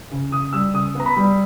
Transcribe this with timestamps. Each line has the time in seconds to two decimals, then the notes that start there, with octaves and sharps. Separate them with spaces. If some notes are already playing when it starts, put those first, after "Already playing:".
0.11 C#3
0.32 C#3 D#6
0.53 G3 E6
0.74 C#3 D#6
0.95 B3
1.00 A#5
1.06 B5
1.16 G3